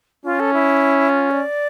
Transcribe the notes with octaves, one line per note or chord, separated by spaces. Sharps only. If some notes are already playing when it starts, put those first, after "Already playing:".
C#4 F4
A4
E4
F4
D5